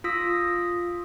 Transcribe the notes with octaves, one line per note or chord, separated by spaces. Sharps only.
F4 D#6 E6 A#6 B6